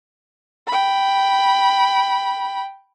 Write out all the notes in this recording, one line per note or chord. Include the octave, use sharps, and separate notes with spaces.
G5 B5